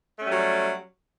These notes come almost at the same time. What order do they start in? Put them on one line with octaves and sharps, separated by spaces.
A3 C#4 G3 F#3